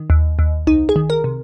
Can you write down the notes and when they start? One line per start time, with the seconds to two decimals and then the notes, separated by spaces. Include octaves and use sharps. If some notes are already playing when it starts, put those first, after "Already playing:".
Already playing: D#3
0.10 D#2
0.39 D#2
0.67 C2 D#4
0.89 G#4
0.96 D#3
1.10 A#4
1.24 C3